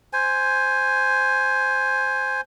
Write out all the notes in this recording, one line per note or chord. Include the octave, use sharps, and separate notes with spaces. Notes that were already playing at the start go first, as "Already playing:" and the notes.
C5 G#5